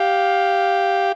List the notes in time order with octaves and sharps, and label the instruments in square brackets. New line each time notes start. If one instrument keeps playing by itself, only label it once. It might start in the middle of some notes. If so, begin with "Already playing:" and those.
Already playing: [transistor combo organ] G4 [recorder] F5